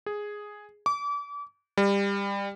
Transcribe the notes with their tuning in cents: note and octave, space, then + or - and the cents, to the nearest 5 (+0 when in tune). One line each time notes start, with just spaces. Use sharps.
G#4 +0
D6 -35
G3 +25